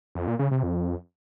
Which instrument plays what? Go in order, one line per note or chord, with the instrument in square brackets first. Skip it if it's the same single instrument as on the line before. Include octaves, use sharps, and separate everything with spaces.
[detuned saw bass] F2
A#2
C#3
C3
F2